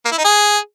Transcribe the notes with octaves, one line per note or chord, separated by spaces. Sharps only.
A#3
E4
D#4
G#4